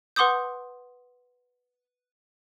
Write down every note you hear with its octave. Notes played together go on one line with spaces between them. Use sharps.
B4 F#5 C6 D6 D#6 G6